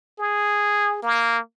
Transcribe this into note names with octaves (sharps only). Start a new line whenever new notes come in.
G#4
A#3